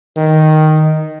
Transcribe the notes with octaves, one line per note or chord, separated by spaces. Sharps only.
D#3